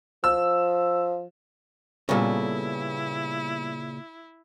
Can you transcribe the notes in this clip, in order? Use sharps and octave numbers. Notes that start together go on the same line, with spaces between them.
F3 E6
A#2 C#3 G3 B3 E4 A4